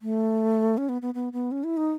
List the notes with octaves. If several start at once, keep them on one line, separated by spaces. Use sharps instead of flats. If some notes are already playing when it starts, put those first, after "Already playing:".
A3
C#4
B3
B3
B3
B3
C#4
E4
D#4